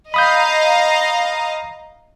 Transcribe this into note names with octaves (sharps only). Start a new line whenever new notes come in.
D#5 F5 A#5 B5 D#6 G6